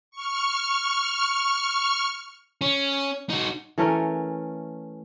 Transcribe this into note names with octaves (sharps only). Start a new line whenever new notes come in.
C#6 F6
C#4
D#4 F#4
E3 A3 C#4 A#4